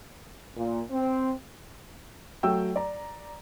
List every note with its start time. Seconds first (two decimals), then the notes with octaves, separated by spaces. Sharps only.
0.55 A#2
0.91 C4
2.43 F#3 A3 G5 E6
2.76 D5 A#5